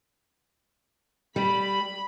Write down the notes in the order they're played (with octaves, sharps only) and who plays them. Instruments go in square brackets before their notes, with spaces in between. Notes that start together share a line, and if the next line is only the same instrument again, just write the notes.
[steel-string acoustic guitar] G3 [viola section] B5